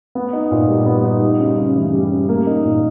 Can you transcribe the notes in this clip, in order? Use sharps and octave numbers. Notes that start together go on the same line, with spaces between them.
B3
D#4
A#2
G3
B3
D#4
G3
C#3
C#3
E3
G3
C#3
A#3
D#4
A#2